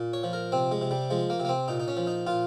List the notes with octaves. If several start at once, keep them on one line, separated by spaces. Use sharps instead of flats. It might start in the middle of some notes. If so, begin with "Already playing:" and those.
Already playing: A#2
C#5
F3
A#4
C3 C4
G#3
C3
G3
F3 G#3
A#3
C3
A#3
C4
A#2 D#4
D#4
C#4
F3
D#4
A#2 F4